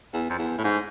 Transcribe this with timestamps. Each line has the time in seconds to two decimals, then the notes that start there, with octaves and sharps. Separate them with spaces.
0.13 E2
0.30 F2
0.38 E2
0.58 A2
0.64 G#2